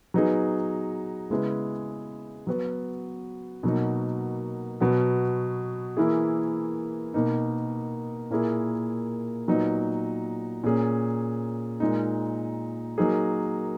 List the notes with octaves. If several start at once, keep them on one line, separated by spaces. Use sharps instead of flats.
F#3 B3 D#4 G#4
C#3 G#3 B3 E4 G#4
F#3 B3 F#4
B2 F#3 A#3 D#4
B2 F#3 B3 F#4
E3 A#3 E4 G#4
B2 A#3 D#4
A#2 A#3 E4 G#4
A#2 F#3 B3 D#4
A#2 A#3 C#4 G#4
A#2 G#3 D#4
F#3 A#3 D#4 G#4